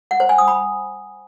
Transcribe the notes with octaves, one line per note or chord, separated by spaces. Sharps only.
F#5
C5
G#5
D#6
B5